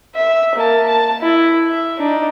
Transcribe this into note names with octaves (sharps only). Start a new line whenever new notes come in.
E5
A#3 A5
A5
E4
E5
D4 D#4